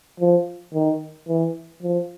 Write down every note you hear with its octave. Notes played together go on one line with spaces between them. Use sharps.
F3
D#3
E3
F3